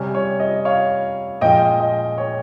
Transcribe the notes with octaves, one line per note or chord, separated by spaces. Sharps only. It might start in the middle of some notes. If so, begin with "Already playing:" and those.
Already playing: C3 G3 C#4
C#5
D#5
C#5 F5
A#2 F3 G#3 C#4 D#5 G5
D#5
C#5